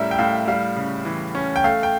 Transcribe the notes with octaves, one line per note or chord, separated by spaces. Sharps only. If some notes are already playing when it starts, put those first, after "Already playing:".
Already playing: A2 G3 C#4 A#4 E5
G5
A2 F5
G3 F5
C#3
E3
C#4
G5
A3 F5
G5